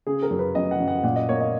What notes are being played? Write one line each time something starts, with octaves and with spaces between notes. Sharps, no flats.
C#3 G#4
A#4
F#2
B4
F#2 D#5
F#5
F#2
F#5
A#2 F#5
D#5
A#3 C#5
D#5